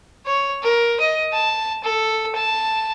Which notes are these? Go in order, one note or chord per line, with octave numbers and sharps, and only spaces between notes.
C#5
A#4
D#5
A5
A4
A5